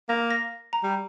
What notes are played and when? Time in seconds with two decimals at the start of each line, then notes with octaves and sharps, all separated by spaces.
0.09 A#3 A#6
0.31 A#6
0.73 A#5
0.83 G3